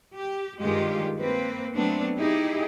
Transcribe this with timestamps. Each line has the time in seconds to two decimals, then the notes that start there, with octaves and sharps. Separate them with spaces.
0.16 G4
0.60 G2 D#3 G#3 F4 G4
1.20 A#3 C4 B4
1.74 F#3 A3 B3 C4 D4
2.17 D#4 E4 G4 G#4